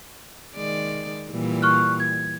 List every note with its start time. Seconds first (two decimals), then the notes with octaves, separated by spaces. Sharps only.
0.56 D#3 G#3 D5
1.29 A#2 E3 G3
1.62 C#6 F6 F#6
2.00 G#6